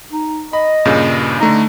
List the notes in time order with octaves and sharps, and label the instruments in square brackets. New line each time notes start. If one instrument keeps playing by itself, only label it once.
[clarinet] D#4
[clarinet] D#5 [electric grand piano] B5
[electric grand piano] G2 A#2 C#3
[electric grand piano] D3 A3 D#4 [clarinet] A#5